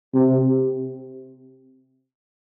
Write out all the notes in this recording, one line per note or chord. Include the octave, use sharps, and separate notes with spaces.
C3